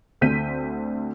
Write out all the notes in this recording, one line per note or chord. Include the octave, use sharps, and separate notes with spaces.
D2 D3 C4 G6 B6 D#7